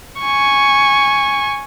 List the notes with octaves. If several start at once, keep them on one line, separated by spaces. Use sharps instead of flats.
G#5 C#6